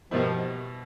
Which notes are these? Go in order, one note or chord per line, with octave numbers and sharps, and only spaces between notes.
B2 D#3 F3 G3 B3 E4